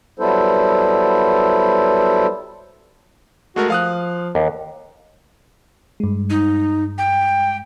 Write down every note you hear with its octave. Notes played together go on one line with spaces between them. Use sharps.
F#3 G3 B3 E4 A4 C5
G#3 A3 F#4 A#4
F3 F5 D#6 F#6
D#2
G2 G#3
D#4
G5